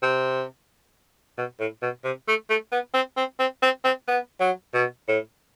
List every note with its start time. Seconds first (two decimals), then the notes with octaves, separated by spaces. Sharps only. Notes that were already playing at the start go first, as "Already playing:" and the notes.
0.03 C3
1.38 B2
1.60 A2
1.82 B2
2.05 C3
2.28 A3
2.50 A3
2.72 B3
2.94 C4
3.17 C4
3.39 C4
3.62 C4
3.84 C4
4.08 B3
4.41 F#3
4.74 B2
5.08 A2